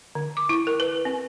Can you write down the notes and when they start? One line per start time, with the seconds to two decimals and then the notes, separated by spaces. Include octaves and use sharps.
0.15 D3
0.37 D6
0.49 E4
0.67 A#4
0.80 B4
1.05 C4